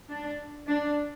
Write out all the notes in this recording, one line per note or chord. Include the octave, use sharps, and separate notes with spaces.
D4
D4